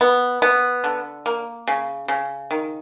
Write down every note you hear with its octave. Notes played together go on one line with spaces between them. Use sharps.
B3
B3
D3
A#3
C#3
C#3
D#3